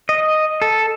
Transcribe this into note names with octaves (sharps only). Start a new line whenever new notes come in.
D#5
A4